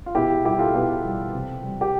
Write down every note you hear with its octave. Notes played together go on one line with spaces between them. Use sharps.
F4
B2 E4 G4
G3 E4 G4
F4 A4
B2 G4 B4
G3
C3
G3
G4